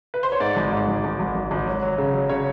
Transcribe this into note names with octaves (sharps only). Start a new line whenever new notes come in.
B4
C5
C#5
G#2 D5
G#1
G#2
G#1
G#1
G#1
G#1
G#1
F#3
F#3
C#3
F#3
C#3 C#5